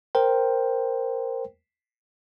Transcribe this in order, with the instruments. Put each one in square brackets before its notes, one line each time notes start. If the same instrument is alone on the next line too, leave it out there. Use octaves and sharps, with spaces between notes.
[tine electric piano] A#4 C5 G5